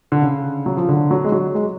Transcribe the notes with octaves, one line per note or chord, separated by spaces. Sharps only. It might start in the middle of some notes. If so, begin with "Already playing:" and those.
D3
C#3
F#3
F3
D3
F#3
G#3
F#3
G#3